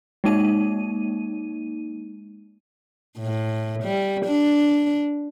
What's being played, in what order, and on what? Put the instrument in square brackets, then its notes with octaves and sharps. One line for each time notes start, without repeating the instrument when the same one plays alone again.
[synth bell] G#3 A#3 D#4 D#7
[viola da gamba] A2
G3
D4